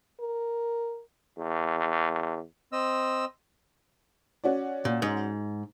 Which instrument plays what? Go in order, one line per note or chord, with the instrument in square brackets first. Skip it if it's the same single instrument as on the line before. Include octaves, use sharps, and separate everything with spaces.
[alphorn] A#4
[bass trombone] E2
[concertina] C4 D#5 E6
[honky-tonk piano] C#4 F#4 D5
[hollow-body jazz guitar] A#2
G#2